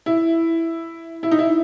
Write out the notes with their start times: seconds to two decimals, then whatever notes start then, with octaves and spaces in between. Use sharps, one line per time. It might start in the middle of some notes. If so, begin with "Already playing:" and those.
0.06 E4
1.23 E4
1.31 D#4
1.39 E4